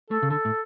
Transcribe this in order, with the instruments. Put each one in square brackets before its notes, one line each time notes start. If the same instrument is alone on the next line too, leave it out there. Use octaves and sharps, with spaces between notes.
[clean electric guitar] A3 [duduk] A4
[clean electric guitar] C#3
[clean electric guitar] D3 [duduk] A4
[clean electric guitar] A2